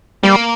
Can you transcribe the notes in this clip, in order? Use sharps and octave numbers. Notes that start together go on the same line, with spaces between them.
G3 A#3